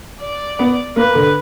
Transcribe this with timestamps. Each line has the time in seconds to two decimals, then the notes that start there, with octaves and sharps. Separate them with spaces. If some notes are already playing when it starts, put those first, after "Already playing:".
0.22 D5
0.59 B3
0.96 A#3 B4
1.15 D3